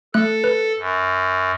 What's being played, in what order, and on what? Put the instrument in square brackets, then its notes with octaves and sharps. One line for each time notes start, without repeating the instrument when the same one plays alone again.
[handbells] A3 F#6 [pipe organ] A4
[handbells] B4
[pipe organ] F#2